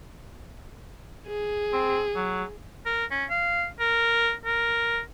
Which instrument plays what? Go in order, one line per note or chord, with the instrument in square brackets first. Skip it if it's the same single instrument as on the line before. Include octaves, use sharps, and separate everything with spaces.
[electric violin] G#4
[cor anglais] C4
F#3
[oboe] A#4
C#4
F5
A#4
A#4